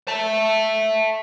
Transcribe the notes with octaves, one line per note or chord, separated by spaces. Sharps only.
E5 A5